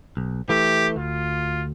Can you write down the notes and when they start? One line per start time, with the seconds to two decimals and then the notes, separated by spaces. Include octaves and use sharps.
0.17 B1
0.49 E3 A3 G4
0.96 D2 F4